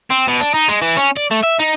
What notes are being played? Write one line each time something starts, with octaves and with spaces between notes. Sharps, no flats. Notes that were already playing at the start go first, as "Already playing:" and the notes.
C4
B2
D4
D#4
G#3
E3
C#4
D5
A3
E5
D#4